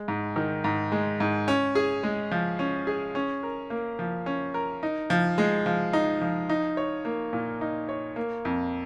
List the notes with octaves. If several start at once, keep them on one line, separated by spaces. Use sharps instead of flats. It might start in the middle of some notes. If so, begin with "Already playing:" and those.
Already playing: G#3
G#2
D#3
G#2
G#3
G#2
C#4
G#4
G#3
F3
C#4
G#4
C#4
A#4
A#3
F3
C#4
A#4
D#4
F3
G#3
F3
D#4
F3
D#4
C#5
A#3
A#2
D#4
C#5
A#3
F2